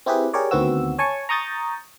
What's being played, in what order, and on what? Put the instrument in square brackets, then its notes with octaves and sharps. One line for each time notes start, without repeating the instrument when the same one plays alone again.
[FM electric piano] C4 E4 G4 G#4 B4
G4 G#4 A#4 C#5 D5
D2 D#3 B3 C4 F#4 E6
C#5 G#5 A5 C#6
A#5 C#6 D#6 G6 A6